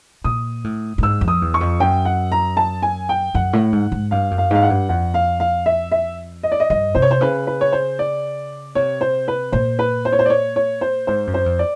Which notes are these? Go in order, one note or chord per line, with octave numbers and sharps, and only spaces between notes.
A#2 D#6
A2
A2
G#2 E6
F2
D#6
E2
C#6
F2
F#2 G5
F#5
A#5
A5
G#5
G5
F#2 F#5
A2
G#2
G#2
G2 F5
F#2
F5
G#2 F5
F#5
G2
F2 F#5
F5
F5
E5
E5
D#5
D5
D#5
G2 D#5
C3 C5
C#5
C5
C#3 B4
B4
C#5
C5
D5
C3 C#5
C5
B4
A#2 C5
B4
C5
C#5
C5
D5
C#5
C#5
C5
G#2 C5
F#2
C5
F2
D5